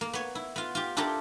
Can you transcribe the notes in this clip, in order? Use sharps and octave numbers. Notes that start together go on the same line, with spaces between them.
A#3
B3 C#5
E4
B3 F4
F4 G4
D4 E4 F4 G4 A4 A#4